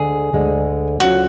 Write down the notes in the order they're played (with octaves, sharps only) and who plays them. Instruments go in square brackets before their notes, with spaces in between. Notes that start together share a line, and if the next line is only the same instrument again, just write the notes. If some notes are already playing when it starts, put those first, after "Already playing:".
Already playing: [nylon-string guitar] D2 D3 G#3 [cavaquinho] G#4
[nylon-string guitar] D2 D3 G#3
[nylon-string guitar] D2 D3 F#3 C#4 F4 [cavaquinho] F#4